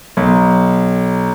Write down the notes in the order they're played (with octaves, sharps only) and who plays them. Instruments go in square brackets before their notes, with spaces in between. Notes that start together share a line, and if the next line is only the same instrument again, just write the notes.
[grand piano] B1